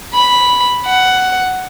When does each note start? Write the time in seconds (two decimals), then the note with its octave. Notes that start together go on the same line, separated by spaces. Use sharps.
0.14 B5
0.86 F#5